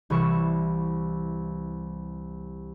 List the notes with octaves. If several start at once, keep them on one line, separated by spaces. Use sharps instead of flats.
C2 E3 C#6 E7